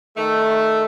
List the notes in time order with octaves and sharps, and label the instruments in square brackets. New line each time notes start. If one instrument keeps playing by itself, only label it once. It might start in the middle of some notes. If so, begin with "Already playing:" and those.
[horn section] D#3 A3